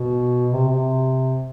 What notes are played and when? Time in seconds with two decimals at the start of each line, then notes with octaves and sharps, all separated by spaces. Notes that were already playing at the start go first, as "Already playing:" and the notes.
Already playing: B2
0.52 C3
0.68 C3